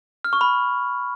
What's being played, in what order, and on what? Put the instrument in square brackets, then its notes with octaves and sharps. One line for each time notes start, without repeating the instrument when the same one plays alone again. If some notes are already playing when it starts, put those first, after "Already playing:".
[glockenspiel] F6
C#6
B5